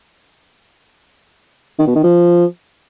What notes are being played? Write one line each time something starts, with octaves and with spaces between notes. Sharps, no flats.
D#3
B2
D#3
F3